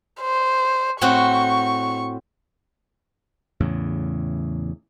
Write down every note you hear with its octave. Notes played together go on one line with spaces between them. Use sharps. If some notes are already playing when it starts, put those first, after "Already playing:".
C5
A2 C4 F#4 C#6
E2 A2 C#3